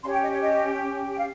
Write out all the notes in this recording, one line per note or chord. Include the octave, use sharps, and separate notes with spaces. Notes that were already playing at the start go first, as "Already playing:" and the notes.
C#4 G4 C#5 C6
G5
D#5
C#5
D#5
G5
F5